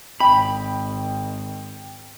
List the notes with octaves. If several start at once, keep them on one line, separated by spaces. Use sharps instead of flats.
G#1 G5 B5